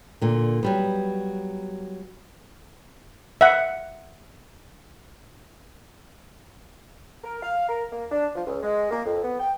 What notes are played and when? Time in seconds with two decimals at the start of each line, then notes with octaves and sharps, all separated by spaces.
0.21 A#2 D3
0.63 F#3 G3 B3
3.41 E5 F#5
7.23 A#4
7.43 F5
7.69 A#4
7.91 A#3
8.12 D4
8.35 F3
8.47 C#2
8.63 G#3
8.90 A#3
9.06 F2
9.23 B3
9.40 G5